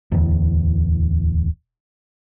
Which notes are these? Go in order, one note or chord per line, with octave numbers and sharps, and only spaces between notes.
D1 E2